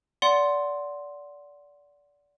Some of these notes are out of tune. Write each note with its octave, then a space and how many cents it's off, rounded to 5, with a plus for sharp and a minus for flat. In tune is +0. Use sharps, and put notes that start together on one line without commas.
D5 -25 F#5 +0 C6 +0